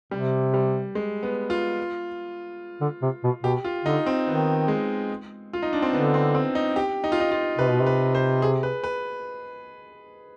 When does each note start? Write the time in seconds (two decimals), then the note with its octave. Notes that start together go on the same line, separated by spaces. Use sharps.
0.11 C3 G3
0.54 G3
0.95 G#3
1.23 B3
1.50 F4
2.81 D3
3.02 C3
3.24 B2
3.43 B2 G4
3.65 F4
3.85 D3 D#4
4.06 C4
4.27 D#3 B3
4.68 G#3
5.53 F4
5.63 D#4
5.73 D4
5.82 C4
5.93 D3 B3
6.14 C4
6.35 C4
6.55 D#4
6.76 G4
7.04 D#4
7.12 F4
7.20 D#4
7.32 F4
7.58 C3 B4
7.70 B2
7.81 C3
7.87 B4
8.15 C5
8.42 G#4
8.63 B4
8.84 B4